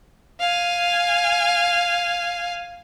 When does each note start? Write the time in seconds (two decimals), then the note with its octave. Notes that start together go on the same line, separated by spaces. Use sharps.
0.40 F5 G#5